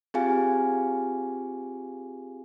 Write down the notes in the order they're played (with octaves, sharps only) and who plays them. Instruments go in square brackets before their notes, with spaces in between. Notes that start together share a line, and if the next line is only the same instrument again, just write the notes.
[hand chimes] C4 F4 G4 G#4 F5 G#5